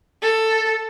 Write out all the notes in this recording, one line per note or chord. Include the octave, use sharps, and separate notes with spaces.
A4